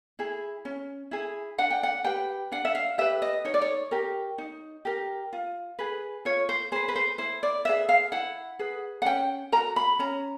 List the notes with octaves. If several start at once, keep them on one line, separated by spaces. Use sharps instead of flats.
E4 G#4
C#4
E4 G#4
D4 F#5
G5
F#5
G4 B4 G5
D4 F#5
E5
F5
G4 B4 E5
D#5
D#4 C#5
D5
C#5
G4 A#4
D#4
G4 A#4
F4
G#4 B4
F4 C#5
C5
G#4 B4 C5
B4
C5
E4 C5
D5
G#4 B4 E5
F5
E4 F#5
G#4 B4
F#5
C#4 G5
F#4 A#4 A#5
B5
C#4 A#5